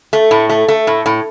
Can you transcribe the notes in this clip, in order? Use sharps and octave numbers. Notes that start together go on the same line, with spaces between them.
A3
A2
A3
A3
A2
A2